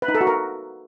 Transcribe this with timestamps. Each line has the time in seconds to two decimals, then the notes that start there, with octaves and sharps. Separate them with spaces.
0.02 B4
0.08 D#4
0.15 A4
0.21 F#4
0.27 A#4